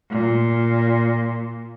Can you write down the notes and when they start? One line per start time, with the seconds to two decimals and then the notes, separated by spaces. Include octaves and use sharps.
0.11 A#2